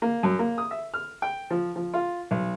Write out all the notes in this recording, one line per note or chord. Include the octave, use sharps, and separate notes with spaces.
A#3
F#2
A#3
D#6
E5
F6
G5
F3
F3
F4
B1